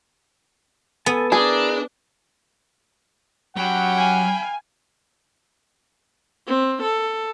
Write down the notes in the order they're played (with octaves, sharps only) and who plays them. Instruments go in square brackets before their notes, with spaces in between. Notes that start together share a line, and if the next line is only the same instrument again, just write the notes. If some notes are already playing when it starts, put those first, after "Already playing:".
[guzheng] B3 [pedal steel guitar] A4 G#5 A5
[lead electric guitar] D4 [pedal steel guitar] E4 A#4 [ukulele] G#4
[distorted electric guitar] F#3 [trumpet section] C#4 G4 F#5 [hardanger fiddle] G5 B5
[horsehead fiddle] F5 G#5
[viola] C4
A4